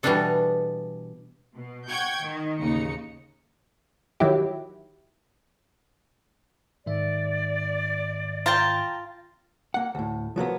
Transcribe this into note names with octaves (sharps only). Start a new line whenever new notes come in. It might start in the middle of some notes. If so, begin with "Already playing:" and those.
B2 E3 G3 B3 D4 A4
B2
F#5 G5 C#6 G6 G#6
D#3
A1 D#2 C#3 D#4 C#7
D#3 F#3 E4 G4
G#2 D#3 D5 E5
F4 G5 A5 A#5
A#3 F#5
D2 A2
F3 F#3 A#3 B3